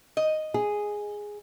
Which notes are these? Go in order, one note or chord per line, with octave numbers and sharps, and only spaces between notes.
D#5
G#4